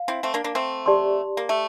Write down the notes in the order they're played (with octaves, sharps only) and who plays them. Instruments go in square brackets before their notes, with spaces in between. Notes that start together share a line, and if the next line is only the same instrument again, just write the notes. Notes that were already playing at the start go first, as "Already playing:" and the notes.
Already playing: [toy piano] F5
[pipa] C4 E4
A3 C4
A#3 D4
A#3 D4
A3 C4
[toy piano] G4 D5 A5 C6
[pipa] A#3
A3